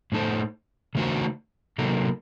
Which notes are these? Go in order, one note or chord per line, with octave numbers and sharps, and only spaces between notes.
A2 A3 D#4 A4 C5
C#3 A3 D#4 F#4 C5
C3 F#3 A#3 D#4 A4